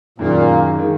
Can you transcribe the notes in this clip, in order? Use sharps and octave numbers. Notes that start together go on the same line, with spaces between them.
F#2 A#2 D#3 G#3 A#3
D#3 G#3